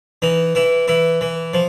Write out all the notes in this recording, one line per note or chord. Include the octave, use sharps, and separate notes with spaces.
E3 D#4
E3 E4
E3 E4
E3
F3